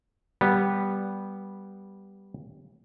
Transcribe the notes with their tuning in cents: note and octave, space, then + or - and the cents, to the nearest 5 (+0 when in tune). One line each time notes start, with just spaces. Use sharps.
G3 +0 B3 -10